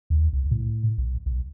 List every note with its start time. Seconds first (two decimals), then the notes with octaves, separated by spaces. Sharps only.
0.10 D#2
0.33 C2
0.51 A2
0.98 B1
1.26 B1